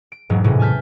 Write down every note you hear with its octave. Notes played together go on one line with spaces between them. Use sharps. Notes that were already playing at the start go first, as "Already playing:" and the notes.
D7
E1 G#2 F#3
A2 C3 E3 G#3 C#4
G#5 A5 F6 G6 B6